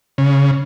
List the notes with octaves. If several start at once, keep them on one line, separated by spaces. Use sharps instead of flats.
C#3